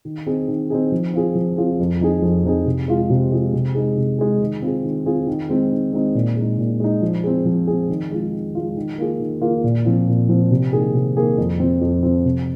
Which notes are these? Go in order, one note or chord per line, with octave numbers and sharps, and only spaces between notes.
D#3
C4 D#4 G#4
D#3
C4 D#4 G#4
F3
C4 F4 G#4
F3
C4 F4 G#4
F2
F3 C4 D#4 G#4
F2
F3 C4 D#4 G#4
C3
G#3 F4 G#4
C3
G#3 F4 G#4
C3
G#3 D#4 G#4
C3
G#3 D#4 G#4
D#3
C4 F4 G#4
D#3
C4 F4 G#4
D#3
G#3 C4 D#4
D#3
G#3 C4 D#4
A#2
G#3
D#4
A#2
G#3 D#4
F3
C4 G#4
F3
C4 G#4
D#3
G#3 F4
D#3
G#3 F4
D#3
A#3 F4 G#4
D#3
A#3 F4 G#4
A#2
F3 C4 F4
A#2
F3 C4 F4
C3
D#3 A#3 G#4
C3
D#3 A#3 G#4
F2
F3 C4
F2
F3 C4
C3